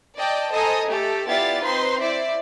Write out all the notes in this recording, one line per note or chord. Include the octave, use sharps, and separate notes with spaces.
D5 D#5 G5 A5
A4 C5 D#5 G#5 A#5 D#6
A3 G4 A4
B3 E4 F4 G4 D5 A6
C4 D#4 B4 C5 C6
E4 C5 D5 E5